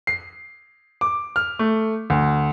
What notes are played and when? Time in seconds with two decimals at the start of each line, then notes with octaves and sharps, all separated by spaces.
0.07 C7
1.01 D6
1.36 F6
1.59 A3
2.10 D2